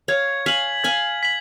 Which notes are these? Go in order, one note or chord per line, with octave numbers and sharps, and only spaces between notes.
C#5 F5 G#6
F5 G#5 B6 F#7
F5 G#5 G#6
B6 F#7